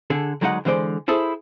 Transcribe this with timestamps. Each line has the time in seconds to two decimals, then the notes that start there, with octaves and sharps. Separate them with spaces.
0.10 D3 G#4 A4
0.41 D2 F#3 G#3 D#4 C5 F#5
0.65 D3 E3 G#3 C5 D5
1.08 E4 G#4 A4 C5